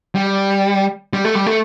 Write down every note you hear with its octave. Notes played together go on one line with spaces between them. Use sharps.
G3
G3
A3
G3
A3